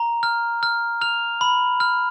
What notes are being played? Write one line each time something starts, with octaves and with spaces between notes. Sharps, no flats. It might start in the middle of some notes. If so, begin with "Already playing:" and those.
Already playing: A#5
F6
F6
F6 F7
B5
F6